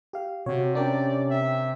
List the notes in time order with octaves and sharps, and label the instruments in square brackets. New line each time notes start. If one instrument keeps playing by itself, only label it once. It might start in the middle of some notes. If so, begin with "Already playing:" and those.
[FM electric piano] G4 F5
[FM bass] C3 [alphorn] F#4 [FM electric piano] C#5
[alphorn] C#4 [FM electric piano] D4 A#4 G5 [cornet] D5
[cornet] E5